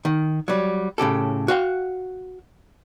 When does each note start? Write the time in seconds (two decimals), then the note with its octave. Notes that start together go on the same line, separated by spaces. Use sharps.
0.05 D#3
0.48 F#3 G3
0.98 A2 C#3 G4 A4
1.48 F#4 F5 G5